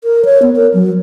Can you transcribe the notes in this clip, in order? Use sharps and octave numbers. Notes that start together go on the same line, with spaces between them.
A#4
C#5
B3
A#4
F#3